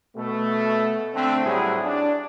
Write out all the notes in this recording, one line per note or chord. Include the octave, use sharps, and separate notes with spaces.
B2 A3
D3 A3 C4
A2 F#3 G3 E4 G#4
D4